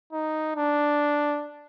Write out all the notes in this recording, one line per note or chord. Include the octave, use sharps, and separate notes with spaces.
D#4
D4